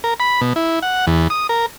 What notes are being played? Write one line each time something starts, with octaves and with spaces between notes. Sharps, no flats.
A#4
B5
B2
E4
F#5
E2
D#6
A#4